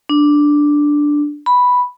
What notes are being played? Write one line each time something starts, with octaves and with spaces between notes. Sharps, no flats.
D4
B5